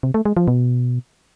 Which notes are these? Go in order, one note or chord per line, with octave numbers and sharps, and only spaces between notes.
C3
A3
G#3
F3
B2